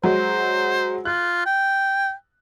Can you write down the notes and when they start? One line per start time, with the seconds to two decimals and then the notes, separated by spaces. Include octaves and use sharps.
0.03 F#3 G#3 F#4 C5
1.05 F4 F#6
1.46 G5